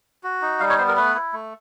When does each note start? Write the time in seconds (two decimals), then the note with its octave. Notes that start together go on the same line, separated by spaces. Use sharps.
0.24 F#4
0.42 D#4
0.60 G3 F5
0.69 C#5
0.78 B3 C5
0.88 A#4
0.97 A3 B4
1.15 E4
1.33 A3